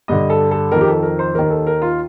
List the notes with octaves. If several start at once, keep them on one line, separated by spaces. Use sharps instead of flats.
G2 D3 D#5
A4
A4
F2 D#3 A#4
G4
A4
A#4
C5
D#2 D#3 A#4
A4
A#4
F4